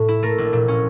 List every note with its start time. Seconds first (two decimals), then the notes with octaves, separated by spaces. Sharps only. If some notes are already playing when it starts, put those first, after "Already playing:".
Already playing: A2
0.08 E4
0.23 A3 A#4
0.38 A#1
0.53 A#2
0.68 C#4